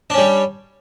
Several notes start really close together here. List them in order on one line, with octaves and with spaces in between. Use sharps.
D4 C#4 G3